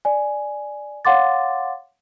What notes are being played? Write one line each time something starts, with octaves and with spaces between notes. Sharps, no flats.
D5 G#5
C#5 F5 F#5 C6 D6 A6